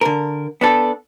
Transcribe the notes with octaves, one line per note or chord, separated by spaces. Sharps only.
D3 A#4
B3 D4 A4